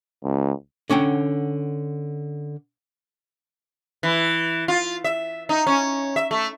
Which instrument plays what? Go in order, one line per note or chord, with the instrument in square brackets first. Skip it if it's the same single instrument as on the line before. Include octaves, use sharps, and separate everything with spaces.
[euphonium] C#2
[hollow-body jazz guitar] D3 C#4 F#5 G5
[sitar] E3
F4
E5
D#4
C#4
E5
A3